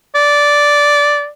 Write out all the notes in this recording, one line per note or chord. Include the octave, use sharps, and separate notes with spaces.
D5